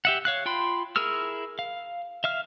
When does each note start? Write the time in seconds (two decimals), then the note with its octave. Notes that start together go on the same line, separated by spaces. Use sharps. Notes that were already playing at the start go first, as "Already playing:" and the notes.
0.05 G4 E5 F#5
0.25 C#5 F5 F#6
0.46 F4 G5 B5 C6
0.96 E4 G#4 A#4 E6 F6
1.59 F5
2.24 E5 F5 F6